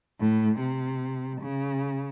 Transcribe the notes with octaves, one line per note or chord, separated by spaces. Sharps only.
A2
C3
C#3